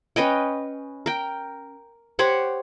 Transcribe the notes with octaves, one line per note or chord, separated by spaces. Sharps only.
C#4 B4 D#5 G5
A#4 G5
G4 C5 C#5 F#5